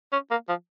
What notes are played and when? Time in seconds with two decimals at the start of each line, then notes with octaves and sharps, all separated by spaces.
0.13 C#4
0.31 A#3
0.49 F3